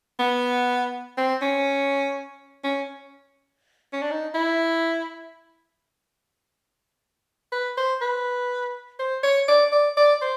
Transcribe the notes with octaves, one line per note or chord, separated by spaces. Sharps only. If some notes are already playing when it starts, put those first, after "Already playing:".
B3
C4
C#4
C#4
C#4
D4
D#4
E4
B4
C5
B4
C5
C#5
D5
D5
D5
C5